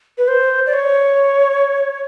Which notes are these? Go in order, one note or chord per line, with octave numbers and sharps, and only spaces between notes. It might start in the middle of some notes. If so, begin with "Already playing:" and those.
B4
C5
D5
C#5